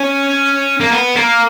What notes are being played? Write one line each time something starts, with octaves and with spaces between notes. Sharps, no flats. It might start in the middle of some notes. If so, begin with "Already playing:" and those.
Already playing: C#4
A#3
B3
A#3